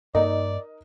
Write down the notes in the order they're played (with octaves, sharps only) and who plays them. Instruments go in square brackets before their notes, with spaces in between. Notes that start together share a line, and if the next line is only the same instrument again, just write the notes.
[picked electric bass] G2 A#3 [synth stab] D#4 [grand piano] A#4 D#5 [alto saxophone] D5